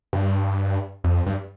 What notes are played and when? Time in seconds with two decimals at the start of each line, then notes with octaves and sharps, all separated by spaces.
0.13 G2
1.04 F2
1.26 G2